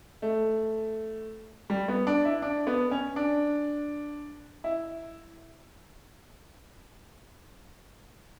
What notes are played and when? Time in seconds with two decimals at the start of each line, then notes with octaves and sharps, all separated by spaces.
0.22 A3
1.70 G3
1.88 B3
2.07 D4
2.25 E4
2.42 D4
2.67 B3
2.91 C#4
3.16 D4
4.64 E4